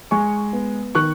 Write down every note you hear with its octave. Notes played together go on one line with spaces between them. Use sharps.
G#3 G#5 C#6
B3
D#3 C#6 F#6